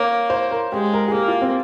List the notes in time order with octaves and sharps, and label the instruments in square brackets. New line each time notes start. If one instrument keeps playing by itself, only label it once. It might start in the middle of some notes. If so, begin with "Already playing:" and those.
Already playing: [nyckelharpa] A#3 [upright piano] C#5
[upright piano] C5
A#4
[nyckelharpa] G#3 [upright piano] G4
[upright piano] A#4
G#4
[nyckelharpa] A#3 [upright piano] G4
[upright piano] F4
C4